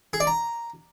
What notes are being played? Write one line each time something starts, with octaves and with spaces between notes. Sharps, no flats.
G#4
D5
A#5